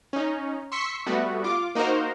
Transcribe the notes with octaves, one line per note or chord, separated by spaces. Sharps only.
C#4 D#4
C6 C#6 E6 B6 C#7
G3 A3 B3 F#4
F4 D6
A#3 D#4 F#4 A#4 C5